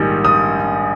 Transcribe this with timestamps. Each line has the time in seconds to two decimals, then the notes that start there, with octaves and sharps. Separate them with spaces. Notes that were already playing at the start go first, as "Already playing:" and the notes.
Already playing: A#1 G#2 D#3 G3
0.25 D#6